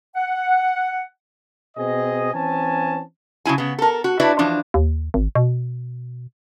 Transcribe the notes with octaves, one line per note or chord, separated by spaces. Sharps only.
F#5
B2 C4 G#4 D#5
E3 C4 C#4 G#5 A5
C#3 F#3 E4 G#5
C#3 B3
A4 A#4
F#4
D4 E4 F#4 B4 D5 E5
E3 F3 D4
D#2
G#1
B2